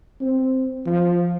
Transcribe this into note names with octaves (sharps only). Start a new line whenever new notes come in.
C4
F3